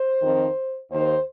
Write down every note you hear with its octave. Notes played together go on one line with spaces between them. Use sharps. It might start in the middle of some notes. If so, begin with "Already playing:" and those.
Already playing: C5
F2 D#3
D#2 D#3 C5